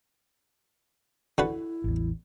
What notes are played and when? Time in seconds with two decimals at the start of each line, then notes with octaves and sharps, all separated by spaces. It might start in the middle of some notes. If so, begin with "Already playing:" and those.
1.38 D3 E4 F#4 B4
1.84 A1 E2